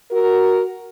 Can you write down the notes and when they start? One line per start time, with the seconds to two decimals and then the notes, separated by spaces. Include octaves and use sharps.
0.11 F#4 A#4